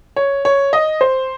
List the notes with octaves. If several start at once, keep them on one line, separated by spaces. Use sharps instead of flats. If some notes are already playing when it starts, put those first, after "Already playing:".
C#5
C#5
D#5
C5